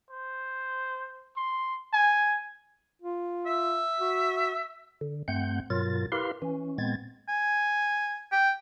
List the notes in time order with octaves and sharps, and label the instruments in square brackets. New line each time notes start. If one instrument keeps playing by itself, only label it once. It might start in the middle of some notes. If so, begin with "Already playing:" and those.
[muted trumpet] C5
C6
G#5
[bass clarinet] F4
[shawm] E5
[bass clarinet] F#4
[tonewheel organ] D3
G2 A3 C4 F#5 G6
G2 B2 F#3 F4 A#4 A6
E4 G4 A#4 B4 F5 C6
E3 C#4
A#2 G#3 B3 C4 G#6 A6
[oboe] G#5
G5